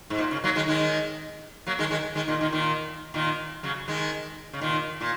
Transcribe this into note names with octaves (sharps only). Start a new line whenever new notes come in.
G#2
A#2
C#3
F#3 A#3
D#3 G#3
D#3 G#3
F#3 A#3
D#3 G#3
D#3 G#3
D#3 G#3
A#2 D#3
A#2 D#3
A#2 D#3
A#2 D#3
C#3 F#3
D#3 G#3
C#3
A#2 D#3
A#2